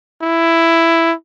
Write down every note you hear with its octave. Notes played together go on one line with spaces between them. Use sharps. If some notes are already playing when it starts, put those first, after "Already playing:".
E4